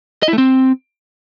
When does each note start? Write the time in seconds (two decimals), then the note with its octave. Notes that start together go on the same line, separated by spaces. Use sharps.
0.23 D#5
0.28 E4
0.33 A3
0.38 C4